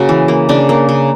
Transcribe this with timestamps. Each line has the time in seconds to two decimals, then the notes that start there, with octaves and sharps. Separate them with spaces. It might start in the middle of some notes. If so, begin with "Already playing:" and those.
Already playing: C#3 A#3 F#4
0.09 E3
0.28 A#3
0.49 C#3 D4
0.69 A#3
0.89 C#3